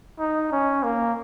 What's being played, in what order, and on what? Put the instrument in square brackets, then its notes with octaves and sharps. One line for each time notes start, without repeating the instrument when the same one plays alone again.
[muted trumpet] D#4
C#4
A#3